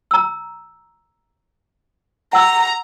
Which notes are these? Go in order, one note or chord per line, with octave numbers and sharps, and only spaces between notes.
A#5 E6
F#5 A#5 E6